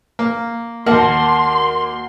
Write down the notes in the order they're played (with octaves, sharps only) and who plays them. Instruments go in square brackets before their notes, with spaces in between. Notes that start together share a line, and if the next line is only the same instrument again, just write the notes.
[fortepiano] A#3
[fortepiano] D#2 F6 [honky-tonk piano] A#3 [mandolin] F#4 F#5 A5 [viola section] C6